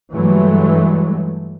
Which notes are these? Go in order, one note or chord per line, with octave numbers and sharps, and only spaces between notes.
G2 E3 F#3 G#3 A3